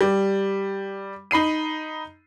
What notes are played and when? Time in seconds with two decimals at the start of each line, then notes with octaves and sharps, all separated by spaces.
0.01 G3
1.31 D#4 B5 C7 D#7